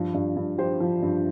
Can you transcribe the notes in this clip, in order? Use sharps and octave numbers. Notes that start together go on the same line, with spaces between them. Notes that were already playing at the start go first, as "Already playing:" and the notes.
Already playing: G2 F3
G2
G2
F3 G4 C5
F3
G2